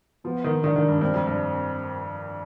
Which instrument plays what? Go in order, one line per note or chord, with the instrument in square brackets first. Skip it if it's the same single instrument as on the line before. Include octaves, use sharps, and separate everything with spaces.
[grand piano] F3 [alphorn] B3
[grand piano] D#3
[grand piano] D#3 [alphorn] D4
[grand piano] D#3
G2
[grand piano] G2 [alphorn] C4
[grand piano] F2
G2